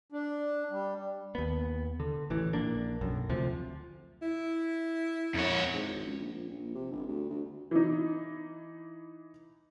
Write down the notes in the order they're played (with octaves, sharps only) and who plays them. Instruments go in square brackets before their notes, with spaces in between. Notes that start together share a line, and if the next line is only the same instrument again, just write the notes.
[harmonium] D4
G3
[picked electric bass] D#2 B3
D3
A1 E3
A#1 A#3 D4
B1 F#2
D2 C3 F3
[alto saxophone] E4
[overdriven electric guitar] F2 C#5
[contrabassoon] G#2
G#1
C#2
A#1
A#1
A#1
C3
G1
D2
D2
[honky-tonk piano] E3 D#4